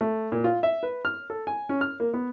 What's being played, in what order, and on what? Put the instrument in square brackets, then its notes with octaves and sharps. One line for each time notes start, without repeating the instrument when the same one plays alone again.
[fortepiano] A3
A#2
F4
E5
B4
F6
A4
G#5
C#4
F6
A#3
B3